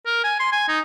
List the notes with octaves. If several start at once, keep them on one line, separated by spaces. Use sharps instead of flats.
A#4
G#5
C6
G#5
D#4